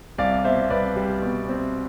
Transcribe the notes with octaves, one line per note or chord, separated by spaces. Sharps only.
C2 D5 F5
D5
B2 C5 E5
C2 B4 D5
G3
B2
C4